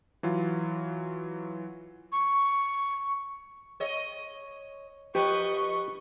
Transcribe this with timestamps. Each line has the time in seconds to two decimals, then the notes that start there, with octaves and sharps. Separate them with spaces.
0.23 E3 F#3 F4
2.12 C#6
3.80 C#5 D#5
5.15 F3 G4 B4 D#5 C#6